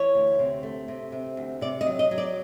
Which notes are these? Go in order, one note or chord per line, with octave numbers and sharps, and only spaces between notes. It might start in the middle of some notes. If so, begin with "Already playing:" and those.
Already playing: E3 C#5
D2
C3
A3
C3
C3
D2
C3 D5
D#5
F#3
D#5
F#3
D5